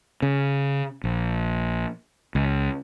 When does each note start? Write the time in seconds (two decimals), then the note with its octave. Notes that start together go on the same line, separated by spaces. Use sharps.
0.22 C#3
1.04 A#1
2.35 C#2